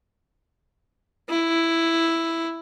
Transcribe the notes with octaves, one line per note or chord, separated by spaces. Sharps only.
E4